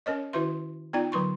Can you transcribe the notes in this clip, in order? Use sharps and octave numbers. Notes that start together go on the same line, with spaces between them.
C#4 A#4 C#5 D#5
D#3 E4 F#4 B4 E5 C6
B3 D#4 F4 D5 G5
D3 F#3 B4 C6 C#6